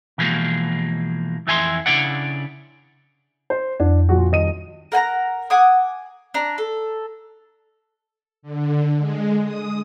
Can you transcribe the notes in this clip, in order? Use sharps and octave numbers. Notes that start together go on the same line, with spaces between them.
B2 E3 F3 G#3 A#3
F2 E3 E5 G#5 B5 C6
C#3 E3 D4 E4 D5 F#5
C5
F2 D4
A#2 F3 F#4
D#1 D#5 D#7
A#4 F#5 G#5 A#5
F#5 G#5 D6 D#6
D4 A#5
A4
D3
G#3
D#6